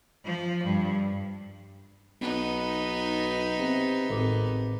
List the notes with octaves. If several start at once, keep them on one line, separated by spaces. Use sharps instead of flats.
F3
G2
B1 B3 D#4
C3
G#1 A2 D6